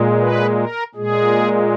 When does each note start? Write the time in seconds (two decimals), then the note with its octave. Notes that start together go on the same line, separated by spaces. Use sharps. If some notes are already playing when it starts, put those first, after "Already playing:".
Already playing: A#2 G#3
0.20 B4
0.57 A#4
0.95 A#2 G#3 G#4